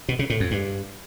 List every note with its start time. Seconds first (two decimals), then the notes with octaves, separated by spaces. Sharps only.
0.09 B2
0.19 C#3
0.30 A2
0.40 F2
0.51 G2